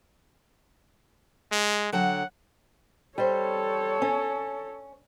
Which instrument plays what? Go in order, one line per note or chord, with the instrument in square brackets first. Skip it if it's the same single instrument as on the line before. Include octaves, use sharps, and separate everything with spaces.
[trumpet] G#3
[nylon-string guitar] D3 F#3 G5 [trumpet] F#5
[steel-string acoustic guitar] G3 C5 [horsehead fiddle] A4 C#5
[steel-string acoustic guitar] C#4